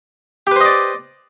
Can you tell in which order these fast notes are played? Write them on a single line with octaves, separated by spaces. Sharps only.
G4 B4 C5 D#5 D5